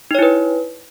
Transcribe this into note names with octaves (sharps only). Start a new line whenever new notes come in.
D#4 E4 B4 C#5